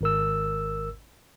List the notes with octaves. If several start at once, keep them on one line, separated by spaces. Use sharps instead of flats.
G#1 A#4 E6